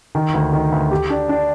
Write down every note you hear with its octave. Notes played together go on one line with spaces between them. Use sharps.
D#3
D2
D#3
D2
G4
D4
D4